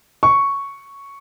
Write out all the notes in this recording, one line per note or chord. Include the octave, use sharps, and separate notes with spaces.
C#6